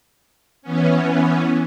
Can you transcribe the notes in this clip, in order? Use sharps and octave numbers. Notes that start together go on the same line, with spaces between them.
E3 B3 C#4